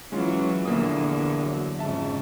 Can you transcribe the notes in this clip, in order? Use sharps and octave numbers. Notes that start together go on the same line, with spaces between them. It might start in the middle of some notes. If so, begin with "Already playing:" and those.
E3 F#3 G#3 C#4 F4
A#1 E2 D3 A#3 D#6
F#3
F2 G#2 C#3 E5 A5